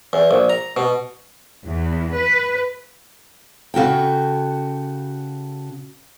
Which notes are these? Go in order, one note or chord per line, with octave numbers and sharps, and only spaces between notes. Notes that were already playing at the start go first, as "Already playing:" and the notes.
E2
A#1
A#5
B2
E2
B4
C#3 F#4 A4 G5